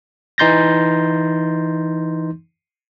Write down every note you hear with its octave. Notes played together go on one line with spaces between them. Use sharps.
E3 D#4 C6 G6 A6 A#6